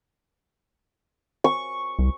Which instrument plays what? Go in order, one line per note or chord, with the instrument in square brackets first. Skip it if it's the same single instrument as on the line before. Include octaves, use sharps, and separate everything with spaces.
[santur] C#6
[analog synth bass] C2